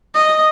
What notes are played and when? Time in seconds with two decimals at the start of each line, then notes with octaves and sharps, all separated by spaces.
0.15 D#5